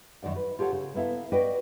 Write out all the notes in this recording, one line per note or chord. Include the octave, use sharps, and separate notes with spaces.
F#2 D#3 F#4 D5 F#5
B4
F4 G4 A4 C#5 F#5
C#3
A#3 B3 E4 A4 F5
F#4 B4 D5 D#5 G5